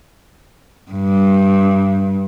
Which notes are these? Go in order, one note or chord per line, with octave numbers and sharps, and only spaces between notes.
G2